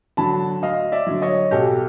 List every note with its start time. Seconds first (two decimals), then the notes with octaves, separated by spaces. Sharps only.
0.17 D3 F#3 A5 B5
0.62 D2 D#5 F5
0.92 D5 E5
1.07 D3 F#3
1.22 C#5 D#5
1.51 B1 G4 A4